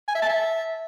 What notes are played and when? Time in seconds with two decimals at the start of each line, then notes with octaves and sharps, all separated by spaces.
0.08 G#5
0.15 E5
0.22 A5
0.29 E5